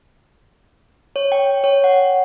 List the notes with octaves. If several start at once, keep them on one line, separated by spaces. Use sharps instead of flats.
C#5
G5
C#5
F#5